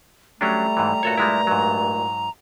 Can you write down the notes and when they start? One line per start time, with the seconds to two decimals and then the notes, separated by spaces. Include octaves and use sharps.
0.41 F#3 G3 A3 C#4 D4 A#5
0.77 G#2 E3
1.03 G2 A#2 A3 F#4 A4 C#5
1.18 G3 G#3 E4
1.47 G#2 F#3